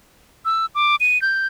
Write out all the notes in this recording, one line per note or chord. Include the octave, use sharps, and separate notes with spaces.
E6
D6
D#7
G6